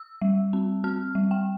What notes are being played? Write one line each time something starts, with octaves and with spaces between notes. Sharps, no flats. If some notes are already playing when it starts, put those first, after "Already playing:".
Already playing: E6
G3
C4
C4 F6
G3
G5